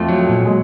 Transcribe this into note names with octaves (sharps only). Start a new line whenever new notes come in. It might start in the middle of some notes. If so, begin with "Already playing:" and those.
Already playing: F2 F3 A3
F#3
A#2
G#3